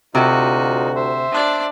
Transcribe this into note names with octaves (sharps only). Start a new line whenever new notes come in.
D2 C3 D#4 F4 F#4
C5 E5
D4 D5